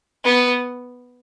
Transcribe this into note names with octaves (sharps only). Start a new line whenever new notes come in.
B3